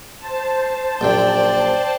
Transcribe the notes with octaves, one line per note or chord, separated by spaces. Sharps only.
C5 A5
A#1 F#2 A#2 D5 G5